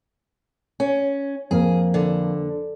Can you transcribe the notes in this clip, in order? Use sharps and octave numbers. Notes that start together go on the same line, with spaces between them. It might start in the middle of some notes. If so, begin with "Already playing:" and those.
C#4
F2 A#3 G#4
D3